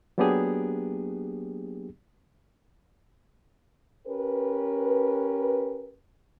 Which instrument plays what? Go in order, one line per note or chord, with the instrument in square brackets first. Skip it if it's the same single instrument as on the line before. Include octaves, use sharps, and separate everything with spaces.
[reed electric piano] F#3 A#3 B3 D4 G4 G#4
[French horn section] C#4 G4 A#4 B4